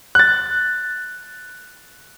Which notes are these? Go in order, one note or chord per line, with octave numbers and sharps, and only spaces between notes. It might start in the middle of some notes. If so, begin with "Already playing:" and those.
F#6 A6